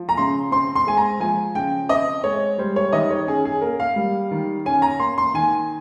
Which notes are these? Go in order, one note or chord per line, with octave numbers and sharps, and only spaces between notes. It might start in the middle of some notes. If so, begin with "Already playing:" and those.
Already playing: F3
A#5
C#3 C6
C4 C6
C6
G#3 G#5
A#5
F3 G#5
C#3 G5
C4 D#5
G#3 C#5
G3 C5
C#5
D#3 D#5
C#5
C#4 G#4
G#4
A#3 A#4
F5
G3
D#3
C#4 G#5
A#5
A#3 C6
C6
D#3 G#5